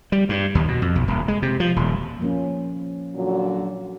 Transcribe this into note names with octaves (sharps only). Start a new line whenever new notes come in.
G3
G2
D#2
B2
F2
B1
D#1
G#3
C3
F3
D#1
F3 A#3 C#4
A#2 D3 F#3